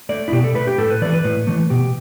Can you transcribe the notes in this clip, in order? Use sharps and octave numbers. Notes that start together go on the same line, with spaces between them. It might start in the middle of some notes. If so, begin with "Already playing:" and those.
A3 D5
E4
B2 G4
A4
A3 B4
G4
A2 A4
B4
E3 A3 D5
B4
A2
E3 A3
B2 G4